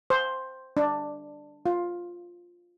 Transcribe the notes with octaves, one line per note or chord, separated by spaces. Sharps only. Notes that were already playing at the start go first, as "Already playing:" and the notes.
C5
D4
F4